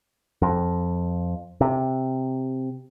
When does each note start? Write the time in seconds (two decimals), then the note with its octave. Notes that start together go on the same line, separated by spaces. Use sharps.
0.42 F2
1.61 C3